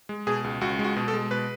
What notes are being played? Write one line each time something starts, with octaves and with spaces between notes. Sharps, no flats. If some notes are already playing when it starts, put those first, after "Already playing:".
G#3
B2 G#4
C#2
C#2 F#4
G#3
F#4
B2
A4
G#3
B2 B4